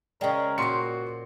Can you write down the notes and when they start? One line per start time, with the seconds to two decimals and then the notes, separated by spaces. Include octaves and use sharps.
0.21 C#3 G#3 A#4 D5 D#5 G5
0.58 A#2 F#4 C5 C6 C#7